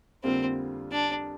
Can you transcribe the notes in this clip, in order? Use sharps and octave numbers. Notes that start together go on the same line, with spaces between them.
F2 D3 G3 A#3 C4 F4
D4